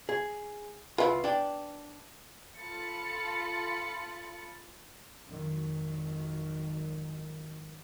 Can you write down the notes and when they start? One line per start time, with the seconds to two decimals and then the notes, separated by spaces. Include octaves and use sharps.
0.09 G#4
0.98 C#2 B3 E4 F4
1.24 D4 G5
2.59 F4 A4 B5 A6 C#7
5.26 G#1 F2 D#3 F#3